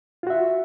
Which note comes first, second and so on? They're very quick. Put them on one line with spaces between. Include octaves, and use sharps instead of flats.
F4 F#4 E5